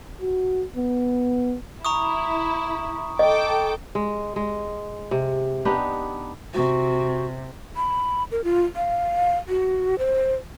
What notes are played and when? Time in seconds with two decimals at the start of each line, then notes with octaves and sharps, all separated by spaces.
0.22 F#4
0.76 B3
1.85 E4 A#5 C#6 D#6
3.19 A4 D#5 G5 D6
3.95 G#3
4.36 G#3
5.11 C3
5.65 B3 D4 D#4 G4
6.54 C3 F#4
7.76 B5
8.31 A#4
8.44 F4
8.76 F5
9.48 F#4
9.99 C5